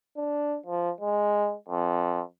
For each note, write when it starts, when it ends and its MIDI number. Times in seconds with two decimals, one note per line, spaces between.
0.17 0.57 62
0.66 0.90 53
1.01 1.54 56
1.68 2.21 41